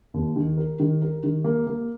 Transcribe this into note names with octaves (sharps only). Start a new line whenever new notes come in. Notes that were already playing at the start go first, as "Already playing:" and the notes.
D#2
D#3
A#4
D#3
A#4
D#3
A#3
A#3